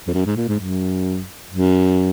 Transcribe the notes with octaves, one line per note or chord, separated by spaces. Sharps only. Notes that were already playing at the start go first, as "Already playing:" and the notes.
F2
F#2
G#2
A#2
G#2
F#2
F#2